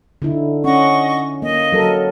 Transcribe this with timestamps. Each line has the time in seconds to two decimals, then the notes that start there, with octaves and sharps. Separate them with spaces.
0.22 D3 D#4 E4
0.64 C#4 D#5 F#5 C#6
1.42 A#3 D#5
1.72 F#3 A4 A#4